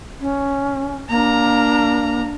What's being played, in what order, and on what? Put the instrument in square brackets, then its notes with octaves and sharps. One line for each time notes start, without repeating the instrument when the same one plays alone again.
[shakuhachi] C#4
[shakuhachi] A#3 [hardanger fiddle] D4 A#5